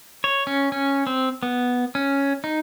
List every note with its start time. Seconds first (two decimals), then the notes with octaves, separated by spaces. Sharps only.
0.24 C#5
0.47 C#4
0.72 C#4
1.07 C4
1.43 B3
1.95 C#4
2.44 D#4